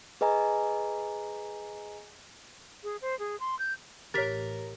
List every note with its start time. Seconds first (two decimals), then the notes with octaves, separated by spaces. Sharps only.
0.21 G#4 B4 D#5 G#5 A#5
2.84 G#4
3.02 C5
3.19 G#4
3.40 C6
3.59 G6
4.14 A1 G4 A#4 C#5 A6 B6